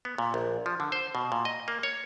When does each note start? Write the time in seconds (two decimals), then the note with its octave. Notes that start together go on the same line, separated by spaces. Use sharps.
0.05 B3
0.18 A#2
0.34 A#1
0.66 F3
0.80 D3
0.92 C5
1.15 B2
1.32 A#2
1.45 D#5
1.68 A#3
1.83 C#5